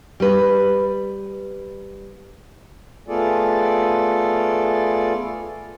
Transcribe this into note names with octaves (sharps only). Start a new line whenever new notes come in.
G3 B4
A3 B3 F4 G#4 A4 D5